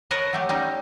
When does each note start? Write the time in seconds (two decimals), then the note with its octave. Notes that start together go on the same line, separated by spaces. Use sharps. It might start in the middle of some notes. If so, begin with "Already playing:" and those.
0.11 A#4 B4 C#5 D#5 A5
0.33 F#3 A3 G4
0.49 G3 C#4 D#4